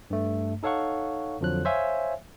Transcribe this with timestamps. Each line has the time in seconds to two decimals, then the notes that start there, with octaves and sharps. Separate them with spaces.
0.10 G2 A3
0.63 D#4 A4 C#5 F5 F#5 C#6
1.41 F2 D3 F3 F#3 F#6
1.65 C5 C#5 E5 F5 G#5